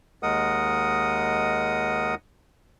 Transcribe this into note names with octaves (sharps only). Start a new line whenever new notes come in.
D#2 G#3 A#4 D#5 F#5 D#6